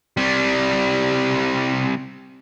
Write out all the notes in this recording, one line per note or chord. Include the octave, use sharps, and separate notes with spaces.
C3 G3